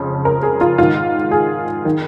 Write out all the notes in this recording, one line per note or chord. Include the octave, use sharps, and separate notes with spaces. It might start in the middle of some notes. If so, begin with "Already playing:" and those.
Already playing: F2 C#3 F3
A#4
G#4
F4
G#2 D#3 F4
G#4
D#3